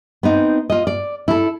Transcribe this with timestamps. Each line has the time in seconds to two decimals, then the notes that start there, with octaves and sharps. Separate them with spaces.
0.23 B3 C4 D#4
0.70 F4 D#5
0.87 D5
1.28 E4 A4